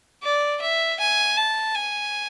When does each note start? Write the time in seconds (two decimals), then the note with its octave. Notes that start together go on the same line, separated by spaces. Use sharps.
0.23 D5
0.61 E5
1.00 G#5
1.37 A5
1.75 G#5